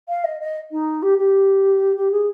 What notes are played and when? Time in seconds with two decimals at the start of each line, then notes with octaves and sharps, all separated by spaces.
0.08 F5
0.24 D#5
0.40 D#5
0.71 D#4
1.02 G4
1.18 G4
1.96 G4
2.11 G#4